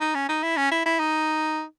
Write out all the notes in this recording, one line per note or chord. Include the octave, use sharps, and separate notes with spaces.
D#4
C#4
D#4
E4
C#4
E4
E4
D#4